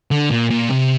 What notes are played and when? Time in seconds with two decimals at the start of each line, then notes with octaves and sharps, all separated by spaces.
0.11 D3
0.30 A#2
0.50 A#2
0.70 C3